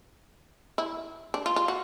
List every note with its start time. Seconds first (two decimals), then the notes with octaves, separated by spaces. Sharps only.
0.78 E4
1.34 D4
1.46 F4
1.56 F4
1.68 F#4